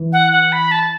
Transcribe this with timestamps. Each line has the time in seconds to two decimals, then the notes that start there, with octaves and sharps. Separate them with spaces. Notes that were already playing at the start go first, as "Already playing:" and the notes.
Already playing: E3
0.13 F#5
0.32 F#5
0.52 B5
0.71 A5